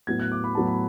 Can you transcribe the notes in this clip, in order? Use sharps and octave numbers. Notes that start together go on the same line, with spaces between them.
A2 F#3 B3 G#6
F#6
D6
B5
A2 F#3 B3 A5
B5